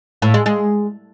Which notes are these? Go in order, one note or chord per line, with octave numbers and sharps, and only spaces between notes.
A2
G#3
G#3